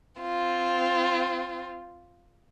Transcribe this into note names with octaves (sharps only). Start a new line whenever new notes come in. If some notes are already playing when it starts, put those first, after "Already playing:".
C4 F4